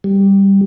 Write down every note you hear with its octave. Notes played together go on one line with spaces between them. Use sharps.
G3